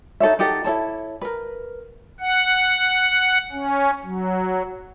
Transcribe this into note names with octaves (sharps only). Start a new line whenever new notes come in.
D#4 A4 C#5 E5
D#4 G4 A4 F#5
E4 A4 C#5 A5
A#4 B4
F#5
C#4
F#3